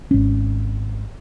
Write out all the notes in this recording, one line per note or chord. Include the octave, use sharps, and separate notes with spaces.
G#1 C#4